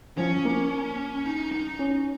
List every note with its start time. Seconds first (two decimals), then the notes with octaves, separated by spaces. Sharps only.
0.18 F3 C#4
0.45 A#3
1.26 D#4
1.52 D#4
1.79 C#4